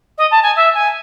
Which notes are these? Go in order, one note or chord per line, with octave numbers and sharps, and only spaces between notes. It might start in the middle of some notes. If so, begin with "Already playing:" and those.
D#5
A5
G#5
E5
G#5